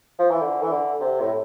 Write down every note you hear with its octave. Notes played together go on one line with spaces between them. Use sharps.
F3
E3
D3
E3
D3
C3
A2